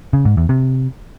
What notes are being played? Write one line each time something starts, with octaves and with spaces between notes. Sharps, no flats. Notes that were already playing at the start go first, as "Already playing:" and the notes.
C#3
G#2
E2
C3